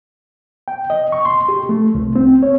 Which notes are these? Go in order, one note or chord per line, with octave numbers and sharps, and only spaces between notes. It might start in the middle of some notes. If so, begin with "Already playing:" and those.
G5
D#5
C#6
C6
G4
A3
C2
C4
C#5